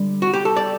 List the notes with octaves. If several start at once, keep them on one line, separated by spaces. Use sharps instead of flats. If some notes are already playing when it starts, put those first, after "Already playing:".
Already playing: D3 G3
F#4
G4
A4
D5